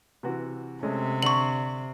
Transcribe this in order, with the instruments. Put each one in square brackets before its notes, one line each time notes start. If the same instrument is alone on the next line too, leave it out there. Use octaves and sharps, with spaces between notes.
[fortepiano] C3 E3 F#4
[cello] C3 [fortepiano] G#3 A3 C#4
[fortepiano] D3 [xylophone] C#6 F#7